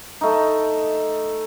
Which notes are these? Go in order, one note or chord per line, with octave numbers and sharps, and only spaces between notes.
A3 D#4